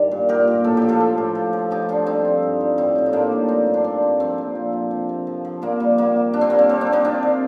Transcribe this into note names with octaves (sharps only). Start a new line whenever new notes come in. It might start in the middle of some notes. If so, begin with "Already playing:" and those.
Already playing: G2 D#3 G3
A#2
A#2 G4 A#4
A#2
A2 A4
F3 G4
F4 A4
F3
A2
F3
F3
F3 D#4 G4
F3 D4 F4
G3 C4 D#4
G3
G2
G3
A2 C4 D#4
A2 F4
D#4
A2 A#3 D4
G3
F3 C4
G2
D4
F3 C4
G2
F3 C4
A#2
F3
F3
C3
C3
F3
F3
A#2 A#3
G3
A#2 A#3
G3
C3 D4
C4
G3 A#3
C4
G3 C4
A#3 D4
C3
C4 D#4
C3 D4 F4
C3